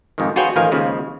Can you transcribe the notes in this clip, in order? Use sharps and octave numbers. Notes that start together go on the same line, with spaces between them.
F2 G#2 D#3
F4 F#4 G#4 B4 C#5 G5
A1 D#3 F3 A#4 F5 G#5
D#2 C#3 F3 G#3